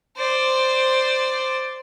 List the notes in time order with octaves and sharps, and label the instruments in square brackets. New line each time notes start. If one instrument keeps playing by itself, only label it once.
[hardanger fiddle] C5 D5